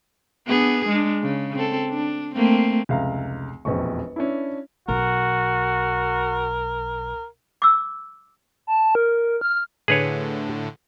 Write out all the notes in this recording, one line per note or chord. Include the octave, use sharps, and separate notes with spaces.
B3 D4 G#4
G#3 D4
C#3
C4 A4
D4
A3 A#3 C4
F1 C#2 G#4 E5 F5 A#5
E1 A#1 F2 B4 D#5 C#6
C#4 D4 E4
B1 F#4 A#4
D6 E6
A5
A#4
F6
A2 D3 G#4 B4 C#5